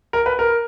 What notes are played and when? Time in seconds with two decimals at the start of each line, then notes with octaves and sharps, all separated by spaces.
0.13 A#4
0.26 B4
0.39 A#4